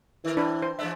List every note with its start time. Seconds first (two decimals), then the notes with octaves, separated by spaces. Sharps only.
0.25 D#3 E3 A#4
0.37 C4 D4 B4
0.62 C5
0.79 E3 G#3 D4 E5